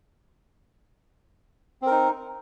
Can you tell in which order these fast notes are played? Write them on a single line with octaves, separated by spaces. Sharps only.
C4 A#4 D#4